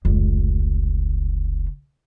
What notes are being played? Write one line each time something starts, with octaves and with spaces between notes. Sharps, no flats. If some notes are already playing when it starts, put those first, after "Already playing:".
F1 C#2